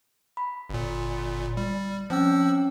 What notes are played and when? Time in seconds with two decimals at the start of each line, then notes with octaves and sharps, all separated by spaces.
0.37 B5
0.70 G1 A#2
1.57 G3
2.10 F3 C4 C#4 G5 E6